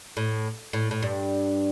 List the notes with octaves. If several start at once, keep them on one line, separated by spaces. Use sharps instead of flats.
A2
A2
A2
G2